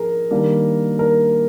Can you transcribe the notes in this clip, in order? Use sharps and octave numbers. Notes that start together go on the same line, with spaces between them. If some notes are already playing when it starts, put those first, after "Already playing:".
Already playing: F3 D4 G#4 A#4
D#3 G3 A#3 D4
A#4